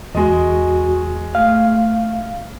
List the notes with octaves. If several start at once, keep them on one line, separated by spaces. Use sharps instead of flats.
E2 G#3 F#4 D#5
A3 F5